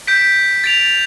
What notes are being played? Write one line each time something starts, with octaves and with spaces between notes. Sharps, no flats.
G6 B6 D7
A6 D7 F7